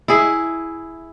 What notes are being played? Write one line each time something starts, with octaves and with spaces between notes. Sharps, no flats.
E4 G#4